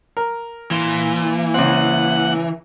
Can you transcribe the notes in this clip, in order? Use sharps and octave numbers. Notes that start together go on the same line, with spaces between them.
A#4
E3 A#3 C6
C#2 C4 F#5